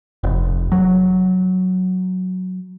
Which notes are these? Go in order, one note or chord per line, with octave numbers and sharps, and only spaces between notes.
F1
F#3